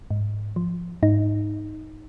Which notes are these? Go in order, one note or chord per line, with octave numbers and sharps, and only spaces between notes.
G#2
F3
G#2 D#4